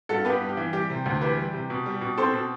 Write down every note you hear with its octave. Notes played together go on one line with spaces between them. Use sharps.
G2 F#4 A4
B3 G4 B4
G2
G4
E3
G3 G4
C3
D2
E3 G4 B4
G3
C3
B2
G3
B2
C4 A4 C5
B2